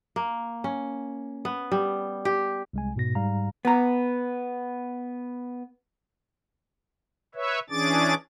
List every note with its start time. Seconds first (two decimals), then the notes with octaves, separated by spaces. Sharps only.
0.16 A#3
0.64 C#4
1.45 B3
1.72 G3
2.25 G4
2.73 C2 G#3 G#5
2.96 G#2 B2 A#6
3.15 G#2 G3 F5 A#5
3.65 B3 A#5
7.35 B4 C#5 E5
7.70 E3 C#4 D4 G#4 D6 A6